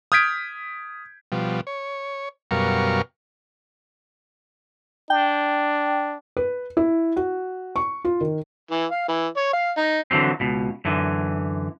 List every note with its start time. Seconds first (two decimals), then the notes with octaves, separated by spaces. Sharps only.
0.12 D#6 F6 G6 G#6 B6 D7
1.32 B2 F3 G3
1.67 C#5
2.51 F#2 B2 G3 A#4 F5 C#6
5.10 D4 G5
6.37 B4
6.77 E4
7.16 F#4
7.76 C#6
8.05 F4
8.21 D#3
8.71 E3
8.91 F5
9.09 E3
9.37 C#5
9.53 F5
9.77 D#4
10.11 D3 E3 F#3 C4
10.40 C#2 B2
10.85 F#2 D3 E3